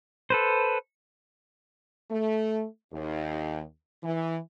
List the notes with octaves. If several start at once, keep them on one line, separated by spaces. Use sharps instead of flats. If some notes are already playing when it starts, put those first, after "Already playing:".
A4 B4 C5
A3
D#2
E3